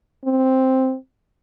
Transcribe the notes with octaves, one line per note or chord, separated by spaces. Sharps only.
C4